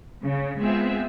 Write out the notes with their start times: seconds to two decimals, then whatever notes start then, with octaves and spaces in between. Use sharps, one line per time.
0.24 C#3
0.61 G#3 B3 C4 F4 G#4 E5